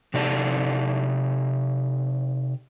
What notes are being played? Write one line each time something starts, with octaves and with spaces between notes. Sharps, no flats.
C3 D#4 G4 A4 D5 A5